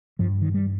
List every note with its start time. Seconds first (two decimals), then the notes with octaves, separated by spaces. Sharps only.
0.19 G2 F3
0.41 D#3
0.54 G3